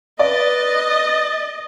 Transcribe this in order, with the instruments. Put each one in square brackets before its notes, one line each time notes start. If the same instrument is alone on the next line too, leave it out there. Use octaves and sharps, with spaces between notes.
[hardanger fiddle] B4 [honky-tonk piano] D5 [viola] D#5 [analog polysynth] A6